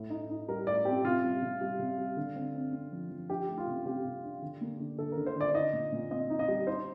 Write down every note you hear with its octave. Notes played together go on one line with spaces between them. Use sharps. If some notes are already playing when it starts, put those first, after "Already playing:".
Already playing: A2
D#4
D#4
G3 A#4
A2 D5
C4 G4
C3 F4
G3
C3
G3
C3
G3
D3
C4
C4
C4
F3
F3
D4 G4
A3
F4
C3
C3 G4
C3
D4
D3
A#3
D3
D3 A4
A#4
D3
C5
D3 D5
D#4 D#5
A#2
A#2
C4 D#5
D#4
D#5
G3
D#4 C5